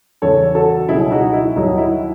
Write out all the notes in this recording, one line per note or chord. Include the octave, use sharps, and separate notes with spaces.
E2 C#3 E3 A4 C#5
F#4 A4
C#2 B2 F#3 E4 G#4
D#4 F#4
E4
D#2 D#3 F#3 D#4 F#4
E4